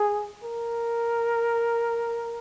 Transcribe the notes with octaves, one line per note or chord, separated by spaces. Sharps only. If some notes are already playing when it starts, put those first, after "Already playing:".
Already playing: G#4
A#4